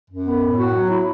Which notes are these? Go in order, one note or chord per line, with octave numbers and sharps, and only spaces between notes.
F#2
B3
A2
F#4
F#3
E4